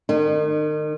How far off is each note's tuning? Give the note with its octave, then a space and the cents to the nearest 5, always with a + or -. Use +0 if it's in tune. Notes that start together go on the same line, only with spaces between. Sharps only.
D#3 -35 D#4 -45